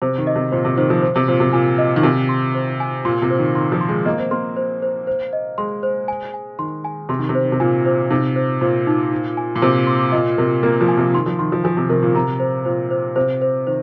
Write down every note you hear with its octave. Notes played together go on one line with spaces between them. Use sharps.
C3 C5
D#3
D#5
C3
A#2 C5
C3
D#3 C5
F3
C5
C3
A#2 C5
C3
A#2 G#5
D#5
D#3
C3 G#5
C6
C5
G#5
A#2 C6
C3
C5
D#3
D#3 C6
F3
C6
G#3
A#3 D#5
C4
A#3 C6
C5
C5
C5
D#5
G#3 C6
C5
G#5
G#5
D#3 C6
G#5
C3 C6
D#3
C3
C5
D#3
C3
A#2 G#5
C5
C3 D#4
C5
A#2 C5
D#4
D#4
G#5
A#2
C3 C5
C6
A#2 D#5
C3 A#4
A#3 A#4
F3
G#5
C3
D#3 C6
F3
D#3 C6
F3
F3 G#5
C3
C3 A#4
A#2
C3 A#5
C5
A#2 C5
C5
C3 C5
C5
D#3 C5